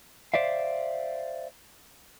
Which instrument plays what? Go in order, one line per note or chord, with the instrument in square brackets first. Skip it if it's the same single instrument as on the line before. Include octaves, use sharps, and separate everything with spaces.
[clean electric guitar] C5 D5 E5 F5